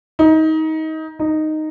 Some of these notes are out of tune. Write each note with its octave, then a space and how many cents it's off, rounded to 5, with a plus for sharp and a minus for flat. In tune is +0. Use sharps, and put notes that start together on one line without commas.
D#4 +25
D#4 -5